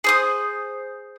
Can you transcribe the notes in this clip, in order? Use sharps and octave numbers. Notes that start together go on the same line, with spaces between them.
G#4 C5 D#6